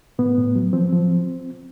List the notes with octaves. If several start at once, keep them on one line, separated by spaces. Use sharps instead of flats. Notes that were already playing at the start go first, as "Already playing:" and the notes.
A2 B3
A2
F#3
F3 C4
F3